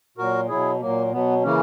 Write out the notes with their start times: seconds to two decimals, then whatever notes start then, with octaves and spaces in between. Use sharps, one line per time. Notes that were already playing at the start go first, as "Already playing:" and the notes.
0.17 A#2 F#3 F#4 A#4
0.49 B2 F#3 E4 G#4
0.80 A#2 F#3 A#3
1.12 B2 F#3 B3
1.43 C#3 E3 A#3 C#4